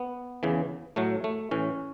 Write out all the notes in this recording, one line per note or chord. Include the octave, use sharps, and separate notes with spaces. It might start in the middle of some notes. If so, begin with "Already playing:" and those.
Already playing: B3
E2 C#3 E3
A2 F#3 A3
A3
A2 E3 C#4